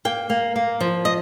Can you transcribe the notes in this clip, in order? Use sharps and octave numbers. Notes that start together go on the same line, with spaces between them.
A#3 G5
A#3
A#3
F3
D#5